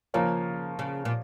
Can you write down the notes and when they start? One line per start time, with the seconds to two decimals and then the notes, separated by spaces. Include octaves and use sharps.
0.14 C#3 F3 A#3 F4 A#4 C#5
0.79 C#3
1.05 A#2